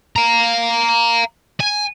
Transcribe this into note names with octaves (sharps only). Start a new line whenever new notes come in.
F5 A#5
G#5